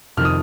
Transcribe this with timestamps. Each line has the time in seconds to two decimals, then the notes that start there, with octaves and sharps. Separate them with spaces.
0.17 F2 C3 D#3 F6
0.25 D#6